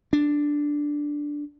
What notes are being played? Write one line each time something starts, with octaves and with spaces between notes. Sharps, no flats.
D4